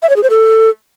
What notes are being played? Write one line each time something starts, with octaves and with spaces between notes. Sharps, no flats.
E5
C#5
G#4
C5
A4